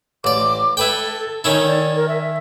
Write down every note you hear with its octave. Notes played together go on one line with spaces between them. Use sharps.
A1 D5 D6
E4 A4 B4 G5
D#3 C#4 D#4 E4
D5
A#4
E5